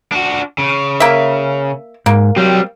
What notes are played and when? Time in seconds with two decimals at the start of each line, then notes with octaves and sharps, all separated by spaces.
0.12 D4 F#4
0.58 C#3
1.00 A#3 E5
2.06 G#2 A#3
2.36 F#3 G3 C4 G4